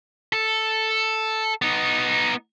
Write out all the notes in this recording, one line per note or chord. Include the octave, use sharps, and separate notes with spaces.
A4
B3 D#4